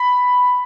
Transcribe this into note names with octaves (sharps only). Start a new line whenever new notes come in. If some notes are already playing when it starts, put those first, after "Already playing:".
Already playing: B5